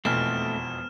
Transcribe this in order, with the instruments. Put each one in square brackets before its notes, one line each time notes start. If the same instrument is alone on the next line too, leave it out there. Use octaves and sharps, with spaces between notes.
[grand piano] E1 F2 E3 [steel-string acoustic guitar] B2 [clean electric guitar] A3 C4 [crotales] F6 E7